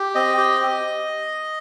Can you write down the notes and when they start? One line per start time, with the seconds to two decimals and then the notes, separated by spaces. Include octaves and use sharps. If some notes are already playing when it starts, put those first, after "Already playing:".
Already playing: G4
0.15 C4 D#5
0.38 G4
0.60 G4